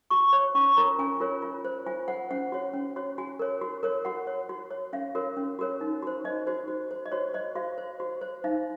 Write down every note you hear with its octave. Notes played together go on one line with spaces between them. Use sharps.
F#4 C#6
C#5
C#4 C#6
F4 A#4 C#5 A#5
C#4 G#5
F4 A#4 C#5
F4
C5
F4 G#5
C5 F#5
C#4 F#5
F#4 C#5
C#4
F#4 C#5
F#4 G#5
A#4 C#5
F#4
A#4 C#5
F#4 F#5
C#5
F#4
C#5
C#4 F5
F#4 A#4 C#5
C#4
F#4 A#4 C#5
D#4
F#4 C5
D#4 D#5
F#4 C5
F#4
C5
D#5
F#4 C#5
C5 D#5
F#4 F5
C5
F#4
C5
D#4 F5